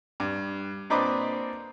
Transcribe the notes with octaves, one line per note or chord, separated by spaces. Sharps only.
G2
A#2 C4 D4 B4 D#5 D6